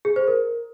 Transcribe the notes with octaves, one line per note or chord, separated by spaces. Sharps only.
G#4
C5
A#4